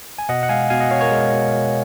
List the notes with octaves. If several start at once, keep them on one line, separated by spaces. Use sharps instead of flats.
G#5
B2 D#5 F#5
F#5
G#3 F5 G#5
B2 F5 G#5
D#5 F#5
B2 C#5 F5
A#4 C#5
G#3
B2
B2